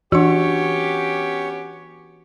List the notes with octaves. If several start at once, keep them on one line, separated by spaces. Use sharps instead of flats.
E3 B3 C#4 D4 F#4 G4 C#5